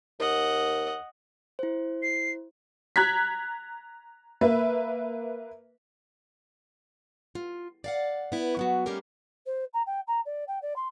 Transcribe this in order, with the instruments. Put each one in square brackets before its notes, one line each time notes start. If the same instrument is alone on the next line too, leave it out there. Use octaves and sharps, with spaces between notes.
[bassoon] D#2 [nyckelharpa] D#5 F#5
[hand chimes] E4 C5
[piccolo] C7
[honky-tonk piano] A#5 F#6 G#6 B6
A#3 B4 E5
[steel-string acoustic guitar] F4
D5 F5 F#5
B3 E4
F#3 B3 F#4
G3 A3 A#3 C#4 G4 A#4
[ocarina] C5
A#5
G5
A#5
D5
G5
D5
C6